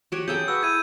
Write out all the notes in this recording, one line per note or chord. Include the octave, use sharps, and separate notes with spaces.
F#4 G4 C#5
C#3 F#3 G#4 A4 G5 G6
F#4 B4 C#6 E6
E4 G#6 D#7